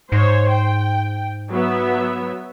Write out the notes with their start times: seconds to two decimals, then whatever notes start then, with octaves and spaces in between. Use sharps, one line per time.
0.12 G#2 C5 C#5
0.52 G5
1.51 F#3 B3 E5